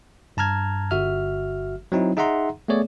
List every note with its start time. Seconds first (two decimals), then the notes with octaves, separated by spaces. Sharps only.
0.37 G2 A5 A#5 F6 G#6
0.91 G1 F#4 E5 F6
1.92 F#3 C4 D#4 E4
2.17 D#4 G#4 E5 F#5 A#5 C6
2.68 A3 B3 G#4 C#5 D5